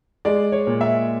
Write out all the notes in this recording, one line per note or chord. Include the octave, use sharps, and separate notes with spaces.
G#3 D5
C#5
A#2
E5